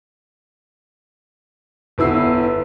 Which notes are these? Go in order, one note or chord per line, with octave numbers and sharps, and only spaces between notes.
G1 B3 E4 E6 C7